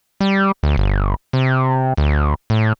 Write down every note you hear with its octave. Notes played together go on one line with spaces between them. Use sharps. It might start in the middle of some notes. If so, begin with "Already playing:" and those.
G3
D2
G1
C3
D2
A2